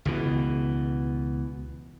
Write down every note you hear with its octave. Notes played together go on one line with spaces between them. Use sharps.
C#2 B2 E3